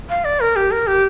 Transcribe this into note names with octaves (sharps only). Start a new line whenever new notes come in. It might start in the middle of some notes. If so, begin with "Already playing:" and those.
F5
D5
A#4
G4
A#4
G4